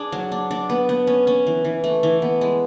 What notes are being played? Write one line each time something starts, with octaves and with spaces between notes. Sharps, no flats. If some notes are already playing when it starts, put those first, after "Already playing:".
Already playing: D4 G#4
F#3
D4
D4
B3
B3
C#4
C#4
E3
E3
A3
E3
B3
G#3